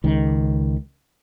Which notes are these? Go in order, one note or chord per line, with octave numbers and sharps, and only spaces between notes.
C#2 D#3